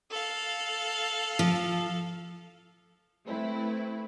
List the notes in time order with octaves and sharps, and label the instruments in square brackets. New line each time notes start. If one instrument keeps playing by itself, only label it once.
[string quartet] A4 F5
[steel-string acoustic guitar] F3
[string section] A3 C4 E4 B4